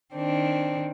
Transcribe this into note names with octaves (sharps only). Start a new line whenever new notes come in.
D#3 C4 D4